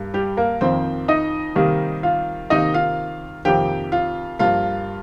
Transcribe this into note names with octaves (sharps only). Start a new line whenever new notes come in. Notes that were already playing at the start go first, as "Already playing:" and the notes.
Already playing: G2 A#3
G3 G4
A#3 A#4
F2 D#3 A#3 C4 C5
D#4 D#5
C3 D#3 G3 A#3
F4 F5
C3 D#3 A#3 D#4 D#5
F4 F5
F2 C3 D#3 A#3 G4 G5
F4 F5
G2 F3 A#3 F4 F5